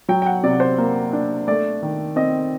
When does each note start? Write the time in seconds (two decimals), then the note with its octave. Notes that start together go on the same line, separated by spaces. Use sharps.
0.09 F#3 G5
0.22 G5
0.26 F#5
0.43 C3 D5
0.60 C5
0.78 A#3
1.13 D4
1.47 A3 D5
1.82 D#3
2.16 C4 D#5